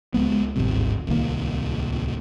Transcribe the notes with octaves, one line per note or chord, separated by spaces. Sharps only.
C#2 G#3 B3
G#1 D2 G2 C3
D1 C2 D#3 A#3